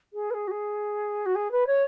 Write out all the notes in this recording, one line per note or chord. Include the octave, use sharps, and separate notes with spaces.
G#4
B4
G#4
F#4
G#4
F#4
G#4
B4
C#5